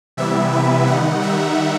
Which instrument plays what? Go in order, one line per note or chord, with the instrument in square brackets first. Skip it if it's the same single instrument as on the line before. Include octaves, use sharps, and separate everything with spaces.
[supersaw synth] C3 E3 G3 B3 E4 E5
B4
D#3 G3 D#4 F#5
E5